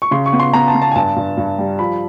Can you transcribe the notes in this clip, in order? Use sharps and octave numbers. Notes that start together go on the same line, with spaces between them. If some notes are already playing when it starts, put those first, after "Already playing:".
C#6
C#3 C6
C#6
B3
C6
B3 A#5
A5
B3
A5
G#5
G2 A5
G2
G2
G3
F3 B5